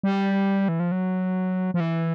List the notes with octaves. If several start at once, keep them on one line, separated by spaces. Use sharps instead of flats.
G3
E3
F3
F#3
F3
E3